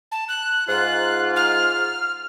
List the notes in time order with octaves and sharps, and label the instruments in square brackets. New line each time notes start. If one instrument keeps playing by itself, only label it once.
[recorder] A5
F#6
[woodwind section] G#2 F4 [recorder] F#6
[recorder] F6